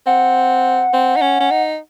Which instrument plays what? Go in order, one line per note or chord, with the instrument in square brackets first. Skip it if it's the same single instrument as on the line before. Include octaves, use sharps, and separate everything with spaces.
[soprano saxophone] C4 [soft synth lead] F#5
[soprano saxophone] C4
D#4
C#4
C#4
D#4